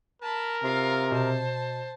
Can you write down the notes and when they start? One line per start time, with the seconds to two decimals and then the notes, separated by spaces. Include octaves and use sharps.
0.22 A#4 A5 B5
0.63 C3 F4 F5
1.12 B2 C5 A5